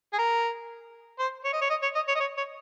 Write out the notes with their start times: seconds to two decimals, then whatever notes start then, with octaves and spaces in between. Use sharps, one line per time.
0.13 G#4
0.18 A#4
1.19 C5
1.44 C#5
1.53 D#5
1.61 C#5
1.70 D#5
1.82 C#5
1.95 D#5
2.08 C#5
2.15 D#5
2.20 C#5
2.37 C#5